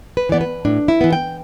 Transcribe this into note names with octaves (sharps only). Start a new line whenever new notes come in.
B4
E3 B3 D5
B4
A2 D4
E4
E3 B3
G5